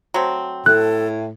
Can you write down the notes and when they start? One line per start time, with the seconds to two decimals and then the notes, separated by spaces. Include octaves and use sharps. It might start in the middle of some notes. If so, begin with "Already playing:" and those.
0.14 F#3 A3 C4
0.66 A2 A4 F#6